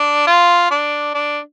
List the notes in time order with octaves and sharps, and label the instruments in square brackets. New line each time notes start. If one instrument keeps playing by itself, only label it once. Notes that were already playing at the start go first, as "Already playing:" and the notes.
Already playing: [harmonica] D4
F4
D4
D4